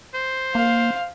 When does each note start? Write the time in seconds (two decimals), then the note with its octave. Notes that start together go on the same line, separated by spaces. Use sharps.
0.15 C5
0.55 A#3 F5